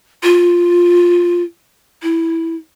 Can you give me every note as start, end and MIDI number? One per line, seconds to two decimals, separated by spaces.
0.23 1.43 65
2.02 2.56 64